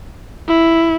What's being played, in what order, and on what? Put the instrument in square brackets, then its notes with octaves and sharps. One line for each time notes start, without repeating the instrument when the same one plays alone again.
[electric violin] E4